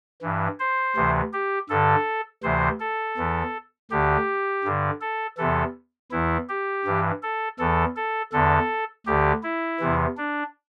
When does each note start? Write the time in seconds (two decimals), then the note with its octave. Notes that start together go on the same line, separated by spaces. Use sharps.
0.22 G2 E3
0.59 C5
0.96 D2 C3 E3
1.33 G4
1.70 G2 D3 A4
2.43 D2 C3 E3 C5
2.80 A4
3.17 E2 E3
3.91 D2 D3 G4
4.64 G2 D3
5.01 A4
5.38 E2 C3 E3 A4
6.11 E2 E3 E4
6.49 G4
6.85 G2 E3
7.23 A4
7.59 E2 E3 A4
7.96 A4
8.32 E2 D3 A4
9.06 D2 D3 G4
9.43 E4
9.80 E2 C3 E3
10.17 D4